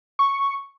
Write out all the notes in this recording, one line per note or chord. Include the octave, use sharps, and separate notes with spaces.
C#6